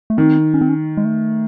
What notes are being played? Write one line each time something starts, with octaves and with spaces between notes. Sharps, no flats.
A3
D#3 C4
C#4
C4
C#4
G#3
A3